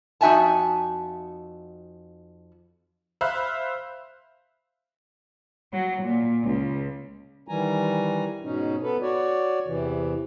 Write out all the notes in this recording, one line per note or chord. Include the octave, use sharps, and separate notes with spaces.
F2 D#4 F#4 E5 G#5 A5
C5 E5 F5 B5 F#6
F#3
A#2
C#2
D#3 E3 G3 G#5 A#5
G#2 B2 C#4 D#4
B3 A4 B4
F#4 C#5 D5
E2 C3 E3